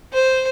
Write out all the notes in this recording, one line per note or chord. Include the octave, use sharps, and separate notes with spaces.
C5